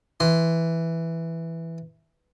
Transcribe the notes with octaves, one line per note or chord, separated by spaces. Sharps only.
E3 C6